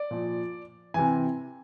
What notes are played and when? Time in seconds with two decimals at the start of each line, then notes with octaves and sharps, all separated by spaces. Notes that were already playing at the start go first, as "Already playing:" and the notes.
Already playing: D5
0.11 A#2 F3
0.94 C3 E3 G#5